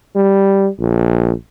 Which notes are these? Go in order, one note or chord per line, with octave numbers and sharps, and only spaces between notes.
G3
A#1